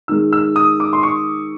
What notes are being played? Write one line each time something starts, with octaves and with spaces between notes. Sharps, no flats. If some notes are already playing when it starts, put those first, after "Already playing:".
D#3 G#3 E6
E6
D#6
D6
C6
C#6